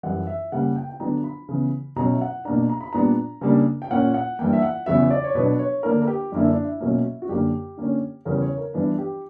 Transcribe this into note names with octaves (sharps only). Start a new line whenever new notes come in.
F#2 E3 G3 F#5
E5
C#3 G3 A#3 F#5
G5
G5
D3 F#3 B3 D4 A#5
B5
C#3 E3 B3
B2 F#3 C#4 A#5
E5
F#5
B2 A#3 D4 A#5
A#5
B5
A#2 G3 B3 D4 A#5
C#3 G3 A#3 D4
G5
A#2 A#3 C#4 F#5
F#5
G2 E3 A#3 G5
E5
F#5
E2 C#3 F#3 B3 E5
D5
C#5
B2 F#3 B3 D4 B4
C#5
D3 A#3 D4 A#4
A#4
G4
F#2 D3 A#3 D4 E4
D4
E4
B2 F#3 A#3 C#4
F#4
F#2 D3 A#3 G4
D3 A#3 C#4
E2 C#3 G3 C#4 A#4
C#5
A#4
G2 E3 B3 D4 B4
G4